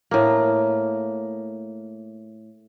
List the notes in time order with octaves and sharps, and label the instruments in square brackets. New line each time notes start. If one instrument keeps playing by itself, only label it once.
[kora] A2 A#3